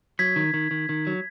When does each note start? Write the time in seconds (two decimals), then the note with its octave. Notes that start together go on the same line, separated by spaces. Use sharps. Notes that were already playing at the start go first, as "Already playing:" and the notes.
0.19 F#3 G#6 B6
0.36 D#3
0.54 D#3
0.71 D#3
0.89 D#3
1.07 F#3